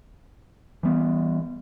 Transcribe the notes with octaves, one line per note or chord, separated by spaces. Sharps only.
E3 G3 B3